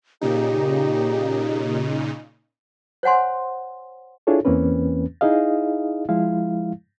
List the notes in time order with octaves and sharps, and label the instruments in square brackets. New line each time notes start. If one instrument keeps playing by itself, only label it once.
[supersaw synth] A#2 C#3 D#4 [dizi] G4
[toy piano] C5 C#5 F#5 G#5 C6
[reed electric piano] D4 E4 F4 G#4 A4 C#5
E2 E3 A#3 C4 C#4 B4
D#4 E4 G#4 D#5 F5
F3 G#3 E4 F5